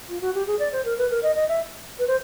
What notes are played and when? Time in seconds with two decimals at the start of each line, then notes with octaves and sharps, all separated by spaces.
0.09 F4
0.21 F#4
0.34 G4
0.47 G#4
0.59 D5
0.73 C5
0.85 A#4
0.98 B4
1.10 A#4
1.23 D#5
1.36 D#5
1.49 E5
1.99 B4
2.08 C5